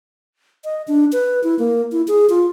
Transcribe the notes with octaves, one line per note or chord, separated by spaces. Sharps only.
D#5
D4
B4
E4
A#3
E4
G#4
F4